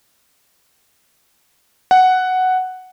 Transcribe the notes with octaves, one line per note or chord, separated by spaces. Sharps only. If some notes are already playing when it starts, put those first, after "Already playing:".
F#5